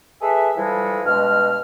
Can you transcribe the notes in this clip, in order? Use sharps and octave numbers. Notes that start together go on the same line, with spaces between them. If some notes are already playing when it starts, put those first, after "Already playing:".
G#4 A4 B4 E5
E3 F3 G3 G#3 A4
G2 B2 G#3 F6